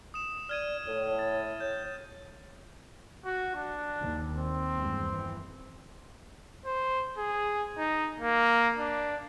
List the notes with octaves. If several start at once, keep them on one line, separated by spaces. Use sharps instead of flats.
D#6 E7
D5 F6 G#6 D#7
A2 C#5
A6
C#5 G6
F#4
D4
D#2
C4
E2 G2 G#3
E3
C5
G#4
D#4
A#3
D4